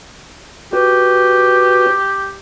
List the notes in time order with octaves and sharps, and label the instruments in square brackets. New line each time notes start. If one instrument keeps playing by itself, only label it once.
[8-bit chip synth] F#4 B4 [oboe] G4